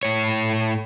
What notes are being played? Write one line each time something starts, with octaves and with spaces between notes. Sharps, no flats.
A2 C#5